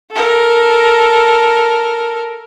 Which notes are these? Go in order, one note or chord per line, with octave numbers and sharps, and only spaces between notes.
A4 A#4